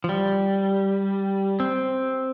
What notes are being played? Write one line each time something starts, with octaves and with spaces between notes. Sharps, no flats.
F3
G3
C4